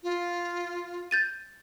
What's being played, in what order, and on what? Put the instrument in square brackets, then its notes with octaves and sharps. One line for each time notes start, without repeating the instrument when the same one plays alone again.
[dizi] F4
[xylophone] G6 A6 D#7